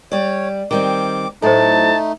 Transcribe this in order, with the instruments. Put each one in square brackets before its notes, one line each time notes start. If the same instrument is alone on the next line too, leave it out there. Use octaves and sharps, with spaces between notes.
[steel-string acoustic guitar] G3 D5 [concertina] C#5
[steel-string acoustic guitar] D#3 G3 C4 [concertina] D6
[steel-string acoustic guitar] A2 F#3 [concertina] A3 D#4 [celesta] A4 C5 [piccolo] A5